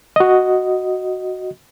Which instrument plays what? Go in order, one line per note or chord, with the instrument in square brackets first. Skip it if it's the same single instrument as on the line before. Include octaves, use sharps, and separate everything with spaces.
[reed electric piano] F#4 D#5